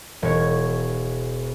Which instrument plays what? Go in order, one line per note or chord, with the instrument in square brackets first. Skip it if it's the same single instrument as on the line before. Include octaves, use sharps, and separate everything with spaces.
[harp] E1 C#5